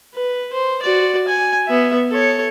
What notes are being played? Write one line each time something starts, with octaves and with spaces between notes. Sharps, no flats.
B4
C5
F#4 D5
G#5
B3 E5
A4 C#5